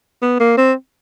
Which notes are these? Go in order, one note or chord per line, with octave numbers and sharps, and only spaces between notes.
B3
A#3
C4